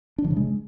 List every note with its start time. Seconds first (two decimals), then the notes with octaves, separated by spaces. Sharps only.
0.18 D4
0.24 E3
0.31 C#3
0.37 G#3